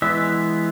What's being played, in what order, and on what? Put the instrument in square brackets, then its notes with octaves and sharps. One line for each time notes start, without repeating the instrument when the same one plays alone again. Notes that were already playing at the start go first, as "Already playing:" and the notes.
[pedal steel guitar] E3 G#3 B3 E5